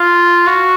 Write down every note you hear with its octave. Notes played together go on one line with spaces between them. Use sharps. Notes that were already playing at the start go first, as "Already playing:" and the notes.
Already playing: F4
F#4